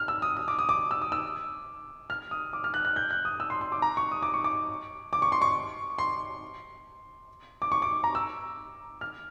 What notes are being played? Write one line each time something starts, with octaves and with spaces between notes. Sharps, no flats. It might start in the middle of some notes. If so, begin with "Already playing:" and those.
Already playing: F6
E6
D#6
D#6
D6
D#6
D6
E6
D#6
E6
F6
D#6
D6
F6
F#6
F#6
G6
F#6
D#6
E6
C6
C6
D6
A#5
C#6
D#6
D6
C#6
D6
D6
C#6
C6
C#6
C6
D6
C#6
D6
A#5
E6
F6